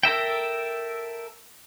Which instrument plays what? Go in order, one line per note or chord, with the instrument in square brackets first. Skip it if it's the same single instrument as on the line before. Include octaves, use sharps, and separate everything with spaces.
[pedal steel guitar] A4 A#4 E5 G5